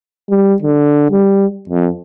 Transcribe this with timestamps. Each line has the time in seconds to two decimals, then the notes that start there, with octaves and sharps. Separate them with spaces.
0.30 G3
0.62 D3
1.11 G3
1.69 F2